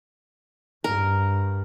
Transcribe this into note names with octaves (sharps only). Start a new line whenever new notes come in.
G2 A#4